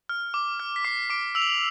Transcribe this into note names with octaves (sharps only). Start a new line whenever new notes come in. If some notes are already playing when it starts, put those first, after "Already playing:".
F6
D6
F6
B6
D6 C7
D6 D7
E6 F7
F#7
F7